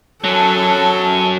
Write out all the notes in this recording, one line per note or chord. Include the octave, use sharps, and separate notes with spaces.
F#3 C#4 A4 A5